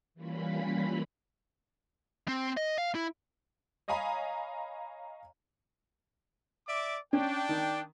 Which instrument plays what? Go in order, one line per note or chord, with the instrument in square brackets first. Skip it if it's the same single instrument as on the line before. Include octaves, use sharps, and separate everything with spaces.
[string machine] E3 G3 A#3 C#4 F4 B5
[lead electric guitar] C4
D#5
F5
E4
[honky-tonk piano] C#5 D#5 F5 G#5 A#5 B5
[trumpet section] D5 E5 D6
[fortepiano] C#4 [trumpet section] D4 G5
[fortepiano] D#3